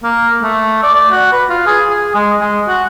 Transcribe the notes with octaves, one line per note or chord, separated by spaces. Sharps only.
A#3
A3
D5
D5
F#4
B4
F4
G#4
G#4
G#3
G#3
F#4